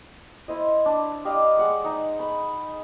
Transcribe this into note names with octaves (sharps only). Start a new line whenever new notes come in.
E4 C5 D#5
D4
G4 D5 D#5 F5
G#3 F#5 D6
D#4 A#5
B5 C#6